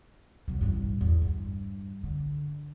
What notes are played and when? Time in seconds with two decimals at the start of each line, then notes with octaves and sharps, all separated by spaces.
0.48 C3 F#3
0.61 A1 G2
1.01 E2
1.22 G2
2.03 D3